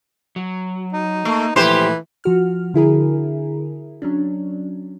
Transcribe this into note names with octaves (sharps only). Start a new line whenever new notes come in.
F#3
D#4
A3 A#3
A#2 E3 F3 A3 G4 C5
F3 F#4 F6
D3 E4 G#4 A#4
F#3 C#4 D4